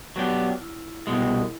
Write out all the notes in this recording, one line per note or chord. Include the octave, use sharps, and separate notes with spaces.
F#3 B3 D4 G4
F4
E4
C2 B2 G#3 E4